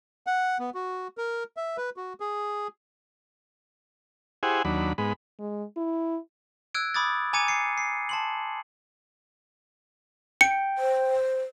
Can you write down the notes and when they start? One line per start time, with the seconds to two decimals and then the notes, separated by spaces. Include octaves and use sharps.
0.27 F#5
0.59 B3
0.74 F#4
1.18 A#4
1.57 E5
1.77 B4
1.96 F#4
2.20 G#4
4.43 E4 G4 G#4 C5 F#5 G#5
4.65 D#2 F#3 D4 B5
4.98 G#2 G#3 B3 B5
5.39 G#3
5.77 E4
6.75 E6 F#6 G#6 D7
6.94 B5 D6 D#6 G#6 A6
7.33 G#5 A#5 D6 G#6 C#7 D#7
7.48 C7 C#7
7.78 C7
8.09 A5 C6 F#7
10.41 G5 C#7
10.78 C5